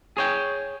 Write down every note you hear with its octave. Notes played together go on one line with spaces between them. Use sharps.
G#4 C#5 G5